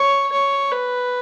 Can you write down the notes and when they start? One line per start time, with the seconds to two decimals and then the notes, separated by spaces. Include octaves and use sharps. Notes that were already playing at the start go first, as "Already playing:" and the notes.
Already playing: C#5
0.32 C#5
0.72 B4